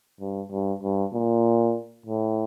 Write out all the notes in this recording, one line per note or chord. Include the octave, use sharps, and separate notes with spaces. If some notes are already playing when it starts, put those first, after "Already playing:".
G2
G2
G2
A#2
A2